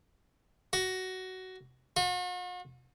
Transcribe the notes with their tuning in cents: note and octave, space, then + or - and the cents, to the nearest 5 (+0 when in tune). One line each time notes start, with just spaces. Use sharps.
F#4 +15
F#4 -45